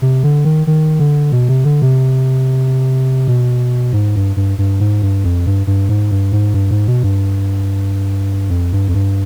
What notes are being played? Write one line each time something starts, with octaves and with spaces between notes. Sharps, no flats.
C3
D3
D#3
D#3
D3
B2
C3
D3
C3
B2
G#2
G2
G2
G2
G#2
G2
F2
G2
G2
G#2
G2
G#2
G2
G#2
B2
G2
F2
G2
F2
G2